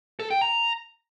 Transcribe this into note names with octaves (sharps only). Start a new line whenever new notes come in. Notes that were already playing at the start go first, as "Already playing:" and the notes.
A4
G5
A#5